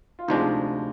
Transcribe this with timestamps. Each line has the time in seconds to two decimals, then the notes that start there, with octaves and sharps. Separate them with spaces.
0.19 F4
0.28 D2 C3 F3 G#3 D4 D#4